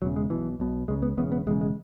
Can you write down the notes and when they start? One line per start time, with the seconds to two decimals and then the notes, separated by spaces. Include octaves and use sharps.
0.02 E1 E2 C#3 F#3
0.16 G#3
0.30 B1 B2 E3
0.60 B1 B2
0.88 C#2 C#3 G#3
1.02 B3
1.17 E1 E2 C#3 B3
1.32 B3
1.47 E1 E2 C#3 G#3
1.61 G#3